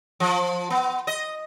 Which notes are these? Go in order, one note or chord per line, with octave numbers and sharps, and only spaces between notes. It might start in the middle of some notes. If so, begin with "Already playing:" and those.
F3
B3
D#5